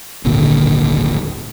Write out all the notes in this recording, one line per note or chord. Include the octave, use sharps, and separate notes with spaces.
D1 G#1 A#2 D3